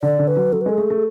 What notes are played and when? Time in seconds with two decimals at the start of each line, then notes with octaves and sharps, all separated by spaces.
0.03 D3 D5
0.19 D3
0.28 B4
0.36 F#3
0.52 F#3 A4
0.61 B4
0.66 G#3 A4
0.78 A3 G#4
0.90 A3